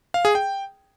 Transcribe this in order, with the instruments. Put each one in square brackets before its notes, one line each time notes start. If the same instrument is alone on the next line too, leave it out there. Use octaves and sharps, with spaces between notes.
[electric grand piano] F5
G#4
G5